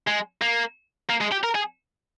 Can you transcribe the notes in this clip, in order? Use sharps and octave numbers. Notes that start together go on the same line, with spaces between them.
G#3
A#3
A#3
G#3
G4
A#4
G#4